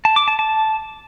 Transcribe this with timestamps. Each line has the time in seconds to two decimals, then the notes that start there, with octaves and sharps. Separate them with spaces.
0.05 A5
0.16 D6
0.28 A5
0.39 A5